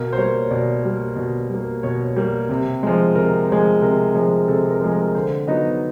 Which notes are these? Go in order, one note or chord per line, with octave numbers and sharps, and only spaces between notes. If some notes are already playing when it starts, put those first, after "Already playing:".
Already playing: B2 A#4
C5
G3 A#3 C#5
B2 D5
G3 A#3
B2
G3 A#3
B2 C#5
G3 A#3
C3
F3 G#3
C3 A#4
F3 G#3
C3 A#4
F3 G#3
C3 A4
A#4
F3 G#3
A#4
D3 C5
F#3 B3 D#4 D#5